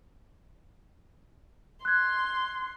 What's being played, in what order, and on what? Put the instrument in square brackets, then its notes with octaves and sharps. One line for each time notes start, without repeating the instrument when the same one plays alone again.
[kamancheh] C6 [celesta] F#6 G#6